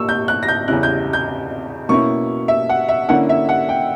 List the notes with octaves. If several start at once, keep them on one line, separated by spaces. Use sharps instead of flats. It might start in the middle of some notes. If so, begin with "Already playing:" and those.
Already playing: A#2 A#3 C#6 E6
G6
F#6
A#6
G6
E2 C#3 G3 C#4 E4 F#6
G6
G6
B2 A#3 C#4 E4 C#6
E5
F#5
E5
D3 A#3 C#4 E4 F#5
E5
F#5
G5